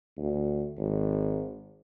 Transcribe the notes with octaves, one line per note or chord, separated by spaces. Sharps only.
D2
G#1